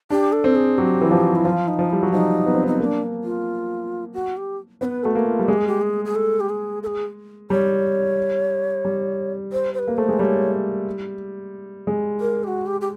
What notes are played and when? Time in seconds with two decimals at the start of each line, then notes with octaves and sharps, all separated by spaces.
0.10 D4 G4
0.33 A4
0.44 C4
0.55 G#4
0.78 F#3 G4
1.01 E3
1.11 F3
1.36 E4
1.45 F3 F4
1.68 D#4
1.79 F3
1.90 G3 E4
2.03 F#3
2.12 F3 D#4
2.46 B3
2.54 C4
2.63 B3 D#4
2.80 A#3 D#4
2.84 D4
3.24 F4
4.14 F#4
4.37 G4
4.81 B3 C5
4.85 B4
5.04 A3 F#4
5.15 A#3
5.26 F4
5.39 G3
5.48 G#3 G4
5.58 G#4
5.67 G4
5.82 G#4
6.05 G#4
6.15 A4
6.40 G4
6.49 G#4
6.83 A4
6.87 G#4
7.50 G3 C#5
8.85 G3
9.52 C5
9.74 C5
9.79 B4
9.88 A#3
9.97 A3 C5
10.09 G#3
10.19 G3 D5
10.23 C#5
11.87 G#3
12.21 A#4
12.44 G4
12.48 F#4
12.66 G4
12.81 G4